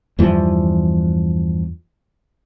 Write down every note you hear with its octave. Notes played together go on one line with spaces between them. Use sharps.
E2 G2 E3 F3